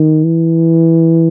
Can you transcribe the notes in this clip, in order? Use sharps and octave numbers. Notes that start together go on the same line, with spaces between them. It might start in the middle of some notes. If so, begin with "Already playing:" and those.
Already playing: D#3
E3